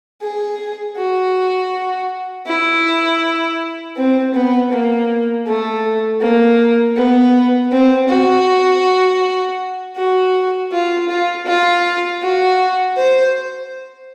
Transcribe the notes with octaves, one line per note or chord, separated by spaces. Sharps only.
G#4
F#4
E4
C4
B3
A#3
A3
A#3
B3
C4
F#4
F#4
F4
F4
F4
F#4
C5